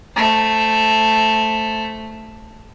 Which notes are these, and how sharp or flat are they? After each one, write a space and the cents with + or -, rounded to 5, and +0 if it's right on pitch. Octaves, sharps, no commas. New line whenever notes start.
A3 +0 C5 +0